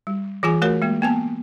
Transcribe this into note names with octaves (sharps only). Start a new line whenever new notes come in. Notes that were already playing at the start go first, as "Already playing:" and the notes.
G3
E3 F4 G#4 G#5
A3 F#4 A#4 C#5
G#3 A#3
A#3 B3 A5